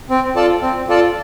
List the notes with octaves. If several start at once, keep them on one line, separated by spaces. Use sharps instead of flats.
C4
F4 A4 D5 A5
C4
F4 A4 D5 A5